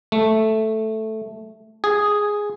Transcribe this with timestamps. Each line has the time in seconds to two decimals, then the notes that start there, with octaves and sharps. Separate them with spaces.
0.12 A3
1.84 G#4